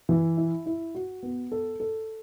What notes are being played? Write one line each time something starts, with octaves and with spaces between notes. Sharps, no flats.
E3
E4
E4
F#4
B3
A4
A4